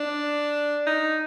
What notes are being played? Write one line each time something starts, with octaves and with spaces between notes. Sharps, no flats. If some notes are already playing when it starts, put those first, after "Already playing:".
Already playing: D4
D#4